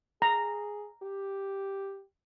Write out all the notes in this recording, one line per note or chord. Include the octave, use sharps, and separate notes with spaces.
G#4 A#5
G4